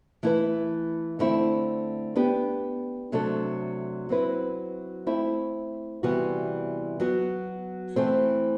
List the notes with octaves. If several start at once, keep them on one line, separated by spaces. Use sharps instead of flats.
E3 A3 E4 B4
D3 A3 C4 E4
B3 D4 G4
C3 F#3 A3 D4 A4
F#3 C4 E4 B4
A3 C4 E4
C3 E3 G3 B3 F#4
F#3 B3 F#4
E3 A3 C4